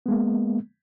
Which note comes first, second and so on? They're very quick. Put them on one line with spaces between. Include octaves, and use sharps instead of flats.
B3 G#3 A#3